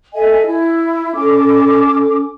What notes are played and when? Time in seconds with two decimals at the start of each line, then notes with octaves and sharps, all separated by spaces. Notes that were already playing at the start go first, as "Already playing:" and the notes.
0.14 A4 D#5 E5 G#5
0.45 E4
1.14 C#4 A4 D6